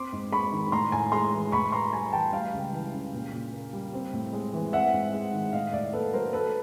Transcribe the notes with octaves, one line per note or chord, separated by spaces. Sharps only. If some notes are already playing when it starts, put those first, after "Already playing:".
Already playing: C4 C6 D6
G#2
G#3 B5 C#6
D#3
A2 A#5 C6
A2 G#5 A#5
G#3 A#5 C6
E3
A2 B5 C#6
A2 A#5 C6
G3 G#5 A#5
E3 G5 A5
G3 F5 G5
C#2
E3
C#3
A#2
A#2
A#3
G3
C4
A2
G#3
E3
C4 E5 F#5
G#2
G#3
D#3
A2 D#5 F5
A2 D5 E5
A#3 A4 B4
F#3 A#4 C5
A3 A4 B4